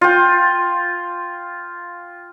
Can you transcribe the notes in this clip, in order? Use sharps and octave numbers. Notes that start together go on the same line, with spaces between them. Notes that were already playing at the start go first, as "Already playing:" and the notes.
F4 G5